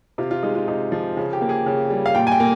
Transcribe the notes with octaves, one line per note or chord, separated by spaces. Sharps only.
C3 F4
F4
G#3 D#4
F4
C3 D#4
F3
C#3
G4
A#3
G#4
C#3
G3
F5
A#2 G5
G#5
G5
A#3